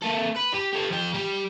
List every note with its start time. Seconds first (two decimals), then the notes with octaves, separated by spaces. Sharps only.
0.02 A#3 A4
0.37 B4
0.54 G4
0.73 G4 A4
0.90 F3 G5
1.14 G3 G4